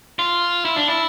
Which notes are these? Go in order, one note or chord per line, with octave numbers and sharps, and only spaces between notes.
F4
E4
D4
E4